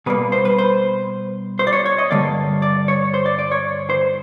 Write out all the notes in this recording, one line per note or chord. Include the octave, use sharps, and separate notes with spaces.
B2 G3 A#3 B4
C5
B4
C5
C5
D5
C#5
C#5
D#5
G2 D3 G3 A#3 D5
D5
C#5
C5
D5
D5
C#5
C5